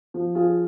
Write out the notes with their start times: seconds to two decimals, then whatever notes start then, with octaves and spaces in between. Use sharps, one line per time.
0.14 F3
0.35 F3 F4 G#4